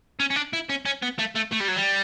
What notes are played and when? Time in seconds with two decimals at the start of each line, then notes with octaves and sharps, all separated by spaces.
0.20 C#4
0.30 C#4
0.36 D4
0.53 E4
0.69 C#4
0.86 C#4
1.03 B3
1.19 A3
1.36 A3
1.52 A3
1.61 G3
1.68 F#3
1.77 G3